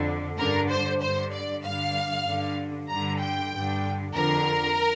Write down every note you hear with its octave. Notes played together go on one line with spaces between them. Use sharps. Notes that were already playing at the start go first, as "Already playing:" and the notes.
Already playing: F2 D3
G2 D3 A#4
C5
G2 D3 C5
D5
G2 D3 F5
G2 D3
G2 D3 A#5
G5
G2 D3
F2 D3 A#4